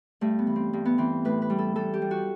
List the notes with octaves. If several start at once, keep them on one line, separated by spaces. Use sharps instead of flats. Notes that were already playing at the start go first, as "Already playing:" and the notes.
G2 A3
B3
E3
C4
G2
B3
E3 C4
A2 B4
B4
G3
A4
G3 A4
G4
G3
F#4